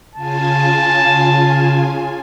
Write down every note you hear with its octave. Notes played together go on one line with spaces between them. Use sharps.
C#3 F4 G#5 A5